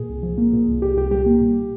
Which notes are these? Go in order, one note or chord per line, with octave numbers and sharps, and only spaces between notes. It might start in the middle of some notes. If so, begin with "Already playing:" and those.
Already playing: A#2 G#4
C2
F3
A#3
A#2
C2
A#2 G4
C2 G4
G3 G4
A#3
A#2